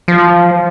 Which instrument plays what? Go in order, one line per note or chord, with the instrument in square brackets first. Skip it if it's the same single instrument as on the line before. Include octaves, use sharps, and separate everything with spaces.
[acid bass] F3